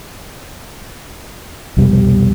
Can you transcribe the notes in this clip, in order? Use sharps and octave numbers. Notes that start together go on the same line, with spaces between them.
C2 F2 B2 G3